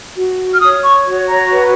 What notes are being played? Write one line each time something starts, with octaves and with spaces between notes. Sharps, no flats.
F#4
F6
C#5 D#6
C#6
F#4
A#5
B4